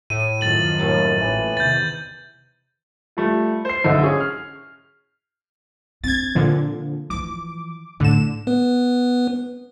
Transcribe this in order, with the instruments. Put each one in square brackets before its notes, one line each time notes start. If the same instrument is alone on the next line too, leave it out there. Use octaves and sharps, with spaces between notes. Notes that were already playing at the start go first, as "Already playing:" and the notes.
[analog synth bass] A2 [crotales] D#7
[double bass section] F#2 D#3 F3 [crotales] A6 F#7
[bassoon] D#2 [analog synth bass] A2
[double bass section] A1 A#2 [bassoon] E3
[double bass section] E2 C3 D#3 [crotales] G6 A6
[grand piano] G3 A3 F4
C5 C7
B1 G#2 D3 C5 E5 F5
C#4 G#4
F6
[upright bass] C4 D4 [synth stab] G#6 A6
[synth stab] A#2 D3 F3
[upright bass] E3 F3 [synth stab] D6
[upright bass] A2 [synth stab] D3 E7
[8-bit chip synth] B3 B4